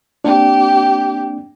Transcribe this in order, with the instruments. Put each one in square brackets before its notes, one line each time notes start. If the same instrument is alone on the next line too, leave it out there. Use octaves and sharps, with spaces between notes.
[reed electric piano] A#3 C4 D4 [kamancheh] G4